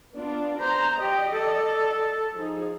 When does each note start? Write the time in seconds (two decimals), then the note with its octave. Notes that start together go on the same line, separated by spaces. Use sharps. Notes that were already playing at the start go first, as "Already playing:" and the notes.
0.14 B3 D4 F4
0.61 C5 A#5
1.00 G4 D5 D#5
1.33 A4
2.35 F3 D#4 G#4